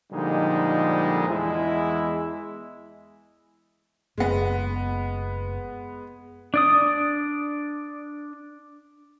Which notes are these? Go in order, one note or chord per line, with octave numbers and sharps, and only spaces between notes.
A#2 D3 F3 G3 G#3 D#4
E2 G#3 E4
F#1 G#3 B3
D4 D5 D#6